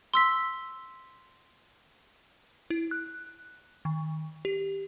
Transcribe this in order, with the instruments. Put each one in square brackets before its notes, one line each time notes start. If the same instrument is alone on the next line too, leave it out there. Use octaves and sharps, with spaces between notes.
[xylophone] C6 E6 B6
[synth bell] E4
F#6
D#3
G4